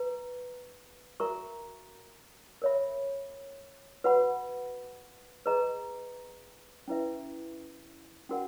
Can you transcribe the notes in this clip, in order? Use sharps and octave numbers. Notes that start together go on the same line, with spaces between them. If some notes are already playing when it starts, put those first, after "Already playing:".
Already playing: B4 A#5
F#4 A#4 E5 A#5 C#6
A#4 C#5 E5 B5
F#4 B4 F#5 B5
G#4 B4 D#5 A#5
C#4 E4 B4 E5
C#4 F#4 A#4 F#5